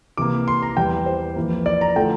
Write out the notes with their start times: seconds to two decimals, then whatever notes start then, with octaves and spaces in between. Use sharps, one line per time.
0.17 C3 E3 A#3 D6
0.48 C6
0.62 A#5
0.77 E2 E3 G3 G5
1.06 C5
1.36 F2 E3 A#3
1.66 D5
1.81 A#5
1.96 D3 F3 A3 G5